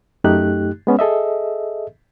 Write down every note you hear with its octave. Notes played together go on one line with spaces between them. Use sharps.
F#2 A3 D#4 G4 F#6
G#3 B3 C#4
G#4 A4 D#5 E5